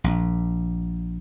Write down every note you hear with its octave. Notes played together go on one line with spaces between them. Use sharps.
A#1